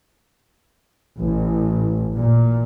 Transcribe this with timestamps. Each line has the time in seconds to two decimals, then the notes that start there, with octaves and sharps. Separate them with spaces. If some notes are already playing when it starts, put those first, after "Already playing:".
1.20 A1
2.14 A#2